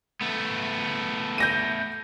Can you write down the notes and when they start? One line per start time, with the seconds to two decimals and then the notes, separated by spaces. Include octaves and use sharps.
0.21 A3 B3
1.38 G6 A#6 D#7